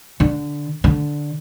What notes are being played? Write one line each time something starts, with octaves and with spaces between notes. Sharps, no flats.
D3
D3